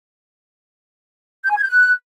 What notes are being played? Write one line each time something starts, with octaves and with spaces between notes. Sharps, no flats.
G6
G#5
G#6
G6
F#6